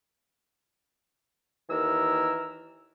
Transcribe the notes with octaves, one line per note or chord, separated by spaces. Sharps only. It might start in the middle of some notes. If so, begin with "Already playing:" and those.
D#2 E3 A#4 E6